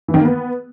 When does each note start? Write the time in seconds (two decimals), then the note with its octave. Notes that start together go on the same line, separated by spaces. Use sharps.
0.08 E3
0.14 D#3
0.19 A#3
0.25 B3